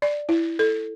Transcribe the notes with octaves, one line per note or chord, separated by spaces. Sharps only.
D5
E4
A4